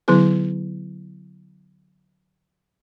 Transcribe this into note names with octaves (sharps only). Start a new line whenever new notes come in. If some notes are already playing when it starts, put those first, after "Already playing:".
D3 F#3 B3 E4 G#4